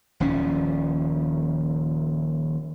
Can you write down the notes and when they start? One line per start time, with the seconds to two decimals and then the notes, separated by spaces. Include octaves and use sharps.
0.20 D#1 D#2 F3 C#4